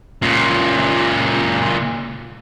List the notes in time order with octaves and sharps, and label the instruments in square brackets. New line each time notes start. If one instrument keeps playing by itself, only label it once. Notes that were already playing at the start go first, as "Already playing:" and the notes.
[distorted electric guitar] C#2 A#2